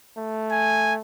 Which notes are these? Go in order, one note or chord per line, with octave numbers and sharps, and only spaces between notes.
A3
G#5